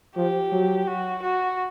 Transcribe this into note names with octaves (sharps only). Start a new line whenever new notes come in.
F3 G4
F#3
F#4
F#4